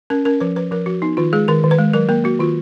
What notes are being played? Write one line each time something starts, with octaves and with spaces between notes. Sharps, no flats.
C#4 A#4
C#4 A#4
F3 B4
F3 B4
F3 A#4
F3 F#4
B3 D#4
D#3 F4
G#3 G#4
D#3 A#4
D#3
B4
G#3
F#3 A#4
A#3 A#4
A#3 F#4
D#3 F4